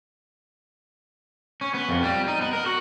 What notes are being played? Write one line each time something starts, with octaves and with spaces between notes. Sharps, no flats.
C#4
B3
F2
G3
D#4
B3
A#4
F#4